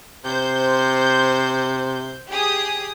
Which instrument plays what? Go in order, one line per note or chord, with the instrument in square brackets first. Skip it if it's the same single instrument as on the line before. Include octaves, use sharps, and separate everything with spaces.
[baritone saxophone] C3 [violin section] C5 G6
[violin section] G4 G#4 D#6